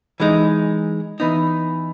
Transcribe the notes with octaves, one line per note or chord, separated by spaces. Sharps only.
E3 G#3 D#4
E3 B3 D#4